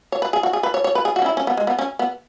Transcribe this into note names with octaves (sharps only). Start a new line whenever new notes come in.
C#5
B4
G#4
F#4
G#4
B4
C#5
C#5
B4
G#4
F#4
C#4
E4
C#4
B3
G#3
B3
C#4
B3